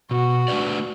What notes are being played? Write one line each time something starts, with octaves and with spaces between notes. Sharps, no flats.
B2 F#4
A3 D4 B4 D5